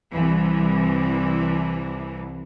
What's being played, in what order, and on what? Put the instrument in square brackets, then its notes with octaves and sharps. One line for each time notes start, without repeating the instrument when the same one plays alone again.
[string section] C2 E3